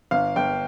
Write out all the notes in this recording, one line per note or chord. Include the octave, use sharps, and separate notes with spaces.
G1 F5
G1 G5